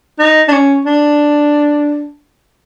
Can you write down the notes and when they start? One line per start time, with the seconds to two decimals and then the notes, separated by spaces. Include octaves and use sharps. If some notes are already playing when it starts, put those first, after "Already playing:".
0.19 D#4
0.48 D4
0.52 C#4
0.86 D4